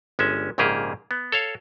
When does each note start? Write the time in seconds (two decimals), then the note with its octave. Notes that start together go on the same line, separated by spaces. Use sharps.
0.19 G1 G#3 C#4 E5
0.58 A#1 G#2 C#3 A#3 G4 G#4
1.11 B3
1.32 A4 C#5 F5